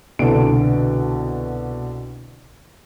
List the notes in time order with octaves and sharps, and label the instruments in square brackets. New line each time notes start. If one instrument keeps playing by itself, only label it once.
[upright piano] C2 B2 D3 A4 D5 D7